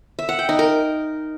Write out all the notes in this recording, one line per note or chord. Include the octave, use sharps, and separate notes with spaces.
E5
F#5
G5
D#4
A#4